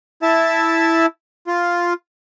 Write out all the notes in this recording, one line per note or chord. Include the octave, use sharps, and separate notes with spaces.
E4 E5 A5
F4